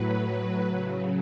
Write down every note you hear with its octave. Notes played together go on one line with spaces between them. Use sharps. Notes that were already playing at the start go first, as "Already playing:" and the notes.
Already playing: A2 F#3 B4
F#3
C#3